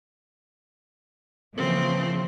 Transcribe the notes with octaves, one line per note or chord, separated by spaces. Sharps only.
C#3 E3 F3 A#3 C4